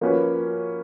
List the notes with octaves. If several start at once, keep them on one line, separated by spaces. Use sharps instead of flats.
F3 A#3 C#4 F#4 B4